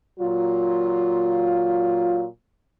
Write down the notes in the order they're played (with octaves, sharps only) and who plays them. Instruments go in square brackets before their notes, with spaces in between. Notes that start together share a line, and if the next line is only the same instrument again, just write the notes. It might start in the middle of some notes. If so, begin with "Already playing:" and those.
[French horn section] A#2 F#3 F4